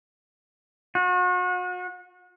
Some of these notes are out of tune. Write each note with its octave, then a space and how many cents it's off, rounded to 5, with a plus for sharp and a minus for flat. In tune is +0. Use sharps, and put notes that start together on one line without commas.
F#4 -40